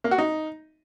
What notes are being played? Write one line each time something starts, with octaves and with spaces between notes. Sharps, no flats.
A#3
F#4
D#4